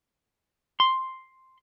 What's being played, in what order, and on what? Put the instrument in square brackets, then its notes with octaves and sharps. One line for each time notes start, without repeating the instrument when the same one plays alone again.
[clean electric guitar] C6